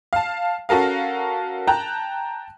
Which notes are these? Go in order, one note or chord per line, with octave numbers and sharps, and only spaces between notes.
F5 A5
C#4 F#4 A4 A#4 F5
G5 A5 A#5 F#6